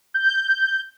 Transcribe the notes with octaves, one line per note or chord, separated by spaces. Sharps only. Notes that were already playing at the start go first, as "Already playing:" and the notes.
G6